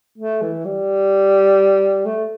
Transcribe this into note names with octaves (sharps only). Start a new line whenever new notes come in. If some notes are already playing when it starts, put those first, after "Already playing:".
A3
E3
G3
A3